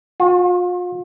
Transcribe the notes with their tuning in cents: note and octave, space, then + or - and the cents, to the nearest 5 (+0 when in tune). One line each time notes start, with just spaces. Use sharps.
F4 +40